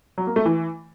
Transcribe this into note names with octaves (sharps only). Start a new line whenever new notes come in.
F#3
A#3
A3
E3